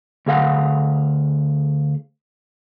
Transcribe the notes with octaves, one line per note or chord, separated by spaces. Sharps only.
D2 G#4 F5 F#5